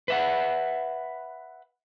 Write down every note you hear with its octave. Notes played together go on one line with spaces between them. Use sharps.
B4 E5 F#5